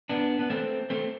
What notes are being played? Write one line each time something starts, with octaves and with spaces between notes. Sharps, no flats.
B3 D4
B3
A3 C4
A3 C4